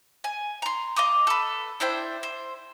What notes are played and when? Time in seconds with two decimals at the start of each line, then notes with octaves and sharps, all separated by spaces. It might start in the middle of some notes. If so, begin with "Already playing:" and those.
0.24 G#5
0.62 A#5 C6
0.96 D#5 F5 D6 D#6
1.27 A4 B4
1.80 D4 E4 C5 G5
2.23 C5